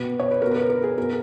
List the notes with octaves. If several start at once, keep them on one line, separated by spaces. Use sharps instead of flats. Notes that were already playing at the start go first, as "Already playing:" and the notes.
Already playing: B2 B4
C#5
B4
B2 A#4
B4
A#4
A#4
G#4
B2 A#4